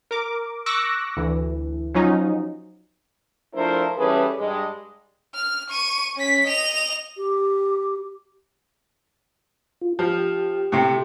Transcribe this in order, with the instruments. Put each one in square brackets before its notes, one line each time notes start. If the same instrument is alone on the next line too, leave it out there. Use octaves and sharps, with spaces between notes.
[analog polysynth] A#4 D6
C#6 D6 E6 F#6 A#6
D2 E3
F3 F#3 C#4 D#4
[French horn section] F3 A3 D4 E4 A#4 C5
E3 G3 C#4 G#4 A4 B4
G2 G#3
[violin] F6
C#6 D#7
C#4 B6
D#5 F7
[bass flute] G4
[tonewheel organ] F4
[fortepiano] F3 [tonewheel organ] G4
[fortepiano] A2 C3